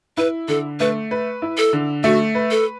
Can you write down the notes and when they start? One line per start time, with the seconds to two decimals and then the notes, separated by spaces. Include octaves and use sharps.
0.17 E4 B4
0.48 D3 A4
0.80 A3 B4
1.11 B4
1.42 E4
1.58 A4
1.73 D3
2.04 A3 F#4
2.35 B4
2.51 A4